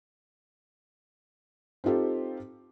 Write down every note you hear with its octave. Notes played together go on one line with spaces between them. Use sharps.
C4 D#4 F4 G4 A4